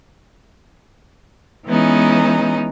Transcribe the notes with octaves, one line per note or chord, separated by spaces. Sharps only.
E3 G#3 B3 C#4 D#4